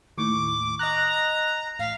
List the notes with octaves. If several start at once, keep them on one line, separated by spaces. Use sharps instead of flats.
D#2 A2 C#6 D6
D#5 A#5 F#6
A1 F5 B6